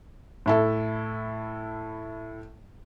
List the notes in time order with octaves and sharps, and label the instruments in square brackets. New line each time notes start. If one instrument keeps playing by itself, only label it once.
[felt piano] A2 E4 A4